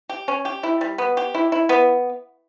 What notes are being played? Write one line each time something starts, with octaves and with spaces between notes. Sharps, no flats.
G4
C#4
G4
E4
G3
B3
G4
E4
E4
B3